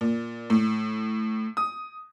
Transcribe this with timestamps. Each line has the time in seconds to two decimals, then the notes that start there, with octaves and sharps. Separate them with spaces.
0.01 A#2
0.50 A2
1.57 D#6